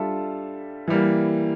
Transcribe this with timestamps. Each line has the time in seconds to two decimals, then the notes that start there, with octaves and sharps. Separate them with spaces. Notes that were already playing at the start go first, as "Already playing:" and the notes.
Already playing: G3 D4 F4 A4 E5
0.88 E3 G3 A#3